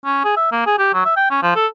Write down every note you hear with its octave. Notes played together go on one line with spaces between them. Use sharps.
C#4
G#4
E5
A#3
G#4
G4
F#3
E5
G5
C#4
F3
A4